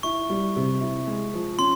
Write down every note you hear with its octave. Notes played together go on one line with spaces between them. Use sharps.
E4 C#6
G3
C3
E4
G#3
F3
C#4 C6